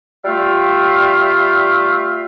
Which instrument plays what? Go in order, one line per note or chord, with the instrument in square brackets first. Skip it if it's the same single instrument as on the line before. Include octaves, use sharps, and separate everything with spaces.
[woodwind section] G3 A3 F4 E5 F5